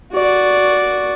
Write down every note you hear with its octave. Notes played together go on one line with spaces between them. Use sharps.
F#4 D5